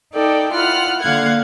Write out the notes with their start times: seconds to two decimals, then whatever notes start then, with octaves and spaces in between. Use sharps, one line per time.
0.13 D#4 A4 D5 G5
0.52 E4 F4 F#5 F6
1.02 D3 A#3 F5 F#5 G#6